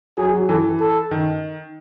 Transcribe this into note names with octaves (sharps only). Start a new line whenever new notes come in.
F#3 G#4
F#3
E3 A4
A4
D#3